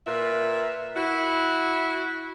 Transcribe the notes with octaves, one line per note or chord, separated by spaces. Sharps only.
A#2 A#4 B4 E5
E4 F#4